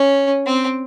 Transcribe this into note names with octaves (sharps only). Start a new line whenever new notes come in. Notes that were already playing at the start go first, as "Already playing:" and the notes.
Already playing: C#4
C4